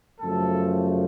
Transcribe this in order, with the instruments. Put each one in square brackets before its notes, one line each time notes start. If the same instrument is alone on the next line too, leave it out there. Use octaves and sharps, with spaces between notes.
[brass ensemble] F#2 C#3 F3 A3 A4